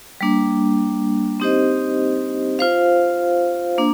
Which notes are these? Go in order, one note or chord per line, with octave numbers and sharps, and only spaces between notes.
G3 A#3 D4
C4 D#4 G4 C5 D#5
F4 C5 F5
A#3 D4